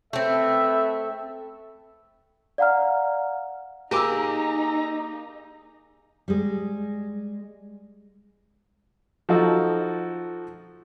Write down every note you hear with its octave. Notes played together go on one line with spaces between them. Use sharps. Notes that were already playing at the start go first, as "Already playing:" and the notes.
A3 C4 A4 B4 E5
D5 F5 F#5 A#5 F6
A#3 D#4 G4 G#4 A#5 D6 E6
G3 G#3
F3 D#4 F#4 A4